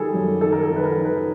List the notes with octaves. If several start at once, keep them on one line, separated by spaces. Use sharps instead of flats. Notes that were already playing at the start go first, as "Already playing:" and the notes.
Already playing: D#3 G3 G#4 A4
F#2
D#3 A4
A#4
A4
D#3
B4
A#4
D#3
B4